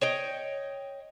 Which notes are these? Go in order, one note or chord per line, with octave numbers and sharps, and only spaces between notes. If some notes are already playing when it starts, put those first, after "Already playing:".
C#5 D#5 G5